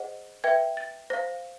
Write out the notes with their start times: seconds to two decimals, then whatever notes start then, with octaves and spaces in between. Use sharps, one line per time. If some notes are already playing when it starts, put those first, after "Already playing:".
Already playing: G#4 C5 D#5 F#5
0.44 B4 E5 G5 G#6
0.77 A6
1.10 C5 F5 A#6